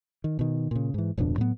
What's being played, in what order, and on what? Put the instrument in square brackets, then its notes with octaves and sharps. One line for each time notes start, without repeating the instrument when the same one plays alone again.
[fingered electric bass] D#3
B2 D#3
A#2 C#3
G#2 E3
D1 F2 B2 D4
A2 F#3 B3